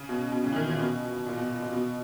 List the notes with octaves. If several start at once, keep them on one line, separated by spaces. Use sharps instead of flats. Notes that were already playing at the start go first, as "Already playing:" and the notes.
Already playing: C#3
B2
B2
C#3
E3
D#3
A#2
B2
A#2
B2
A#2
B2